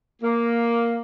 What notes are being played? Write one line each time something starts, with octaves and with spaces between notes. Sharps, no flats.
A#3